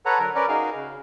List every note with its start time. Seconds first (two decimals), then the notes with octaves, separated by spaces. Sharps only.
0.06 A4 B4 C#5 F#5 A#5
0.19 D3 F#3 A#4
0.35 C#4 A#4 B4 D5
0.48 D#4 F#4 G#4 A#4 F5
0.75 C#3